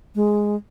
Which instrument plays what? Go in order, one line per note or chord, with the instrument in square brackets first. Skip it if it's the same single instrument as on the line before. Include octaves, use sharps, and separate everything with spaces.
[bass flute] G#3